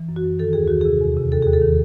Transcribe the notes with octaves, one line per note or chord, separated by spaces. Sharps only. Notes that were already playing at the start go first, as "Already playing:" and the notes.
Already playing: E3
F#2
F#4
F#2
D#3 A4
D#2 G#4
D#3 F#4
C3 G#4
E2
C3
D#2 A4
D#2 G#4
A4
D#3